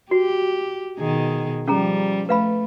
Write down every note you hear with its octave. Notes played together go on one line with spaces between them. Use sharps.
F#4 G4
B2 D#3 G#4
F3 G3 C#4 G#4 A#5
A3 B4 F5 B5